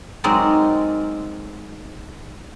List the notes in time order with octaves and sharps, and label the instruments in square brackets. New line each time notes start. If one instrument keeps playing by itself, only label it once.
[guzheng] F#3 G#3 C4 D#4 A#4 D5